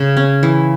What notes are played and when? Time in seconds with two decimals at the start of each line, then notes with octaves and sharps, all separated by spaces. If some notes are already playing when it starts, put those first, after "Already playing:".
Already playing: C#3
0.17 C#4
0.43 E3